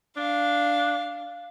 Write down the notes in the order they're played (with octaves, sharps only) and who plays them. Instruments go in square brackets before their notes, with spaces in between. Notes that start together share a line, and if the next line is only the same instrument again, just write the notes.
[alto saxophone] D4 [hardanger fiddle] F5